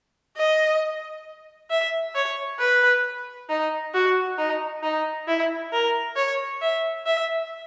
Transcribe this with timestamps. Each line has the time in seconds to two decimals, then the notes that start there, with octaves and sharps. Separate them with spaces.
0.37 D#5
1.70 E5
2.15 C#5
2.59 B4
3.49 D#4
3.94 F#4
4.38 D#4
4.83 D#4
5.28 E4
5.73 A#4
6.16 C#5
6.61 E5
7.06 E5